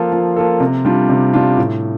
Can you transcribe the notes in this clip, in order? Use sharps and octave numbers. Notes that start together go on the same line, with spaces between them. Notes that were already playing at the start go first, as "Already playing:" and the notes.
Already playing: F3 A#3 F4 A4
F3
A#3 F4 A4
C3
G3 D4 F4
C3
G3 D4 F4
A2